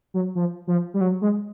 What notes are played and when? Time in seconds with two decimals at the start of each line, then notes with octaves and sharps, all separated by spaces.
0.14 F#3
0.35 F3
0.67 F3
0.94 G3
1.01 F#3
1.22 G#3